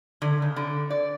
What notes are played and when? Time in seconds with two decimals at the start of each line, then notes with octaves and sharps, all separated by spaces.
0.22 D3
0.42 C#3
0.56 D3
0.90 D5